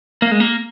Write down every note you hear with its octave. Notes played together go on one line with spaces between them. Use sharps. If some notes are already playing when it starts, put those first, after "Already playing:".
A#3
G#3
A#3